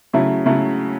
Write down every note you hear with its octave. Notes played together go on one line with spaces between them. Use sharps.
C#3 F#3 A3 E4
C#3 F#3 A3 E4